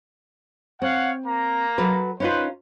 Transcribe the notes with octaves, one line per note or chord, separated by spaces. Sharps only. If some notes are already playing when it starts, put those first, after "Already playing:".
C4 C#5 F5 F#5
A#3 A#5
F#3 A4 B4
C#4 D#4 F4 B4 C5